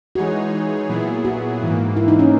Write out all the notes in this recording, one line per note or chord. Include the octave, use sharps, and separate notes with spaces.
E3 G#3 D#4 F#4 G#4 C#5
A#2 F#3 B3 E4 G#4
F#4
G#2 E3 A#3
E4
D#4
C#4